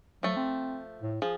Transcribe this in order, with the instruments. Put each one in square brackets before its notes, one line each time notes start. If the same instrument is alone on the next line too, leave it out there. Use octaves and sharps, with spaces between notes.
[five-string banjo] F3 A3 [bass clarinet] F#3
[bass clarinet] C4
A2
[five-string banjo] F3 [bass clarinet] G#4